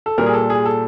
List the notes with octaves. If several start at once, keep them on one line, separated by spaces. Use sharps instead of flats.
A4
A#2 G3 A#4
G#4
A4
G#4
A4